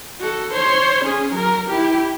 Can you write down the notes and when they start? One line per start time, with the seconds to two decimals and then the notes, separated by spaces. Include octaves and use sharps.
0.20 F#4 A4
0.54 C5 C#5
1.05 C#4 G#4
1.34 F#3 A#4
1.68 E4 G4